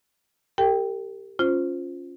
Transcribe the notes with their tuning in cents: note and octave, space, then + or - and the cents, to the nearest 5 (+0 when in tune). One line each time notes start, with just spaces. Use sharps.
G4 +5 A#4 -45 G5 +0
C#4 -5 F4 +0 C5 +0